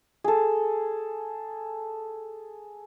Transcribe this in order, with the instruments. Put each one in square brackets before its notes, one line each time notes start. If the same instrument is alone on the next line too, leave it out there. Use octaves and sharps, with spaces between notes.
[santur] G#4 A4